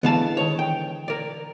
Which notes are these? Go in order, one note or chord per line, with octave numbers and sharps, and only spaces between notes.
D3 E3 G#3 B3 F5 A5
D#3 C#5
G5
A#4 D5